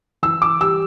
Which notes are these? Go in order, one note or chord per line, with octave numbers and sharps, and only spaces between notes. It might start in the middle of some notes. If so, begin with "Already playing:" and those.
E3 E6
D6
G3 E6